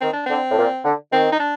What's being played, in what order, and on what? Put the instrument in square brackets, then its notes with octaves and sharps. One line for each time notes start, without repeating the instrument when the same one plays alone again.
[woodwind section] D#3 [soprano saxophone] C4
[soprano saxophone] D4
[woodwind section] D3 [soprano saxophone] C4
[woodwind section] A2
A#2
D3
[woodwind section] D#3 [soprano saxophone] C4
[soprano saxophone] D#4
D4